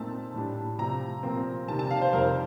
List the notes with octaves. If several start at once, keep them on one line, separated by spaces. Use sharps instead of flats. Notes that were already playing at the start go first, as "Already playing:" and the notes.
Already playing: A#2 A3 C4 D#4 A5
A2 G3 D4
C3 F3 A3 A#5
A#2 F3 C4
C3 D#3 G3 A5
A5
F5
C5
F2 C3 G3 A#3 D#4 A#4